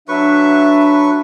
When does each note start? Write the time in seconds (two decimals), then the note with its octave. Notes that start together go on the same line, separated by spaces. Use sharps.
0.08 F#3 D4 B4 E5 C#6